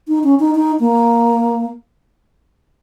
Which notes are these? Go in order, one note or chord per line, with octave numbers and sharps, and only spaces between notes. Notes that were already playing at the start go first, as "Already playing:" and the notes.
D#4
C#4
D#4
D#4
A#3